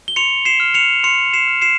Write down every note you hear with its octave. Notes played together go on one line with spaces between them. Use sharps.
G7
C6 C#7 F7
C7 E7
F6
C#7 F7
C6 C#7 F7
C7 E7
F6
C7 E7